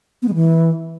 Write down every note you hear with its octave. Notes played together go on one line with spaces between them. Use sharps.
B3
G#3
E3